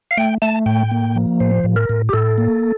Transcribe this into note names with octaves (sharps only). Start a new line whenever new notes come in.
F5
A3 G5
A3 A5
A2 G5
A#3
F3
A2 C5
A2
A#4
A2
G4
A2 A4
A#3